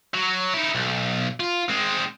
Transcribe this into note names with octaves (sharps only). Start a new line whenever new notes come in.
F#3
D#4 E4
B1
F4
G#3 C4